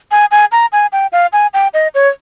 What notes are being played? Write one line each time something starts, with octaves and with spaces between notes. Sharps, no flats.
G#5
G#5
A#5
G#5
G5
F5
G#5
G5
D#5
C#5